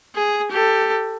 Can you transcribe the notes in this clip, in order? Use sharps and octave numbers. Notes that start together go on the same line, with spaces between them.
G#4
G4 A4